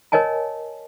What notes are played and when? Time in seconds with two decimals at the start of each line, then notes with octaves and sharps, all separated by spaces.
0.12 A#4 C#5 D#5 G#5 A5